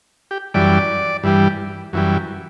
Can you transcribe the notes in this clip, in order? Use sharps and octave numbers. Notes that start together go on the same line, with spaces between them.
G4
F#2 E3 G3 D5
G2 E3 G3
F#2 E3 G3